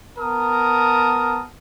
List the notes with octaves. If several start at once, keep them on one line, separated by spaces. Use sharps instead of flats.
B3 A#4 A5 D#6